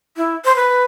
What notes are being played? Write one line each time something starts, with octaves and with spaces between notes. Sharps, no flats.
E4
C5
B4